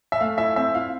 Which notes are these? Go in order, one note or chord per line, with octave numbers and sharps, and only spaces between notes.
E5
A3 F5
E4 E5
C4 E5
E4 F5